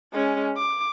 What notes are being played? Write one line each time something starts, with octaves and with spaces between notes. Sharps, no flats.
G#3 C#4
D6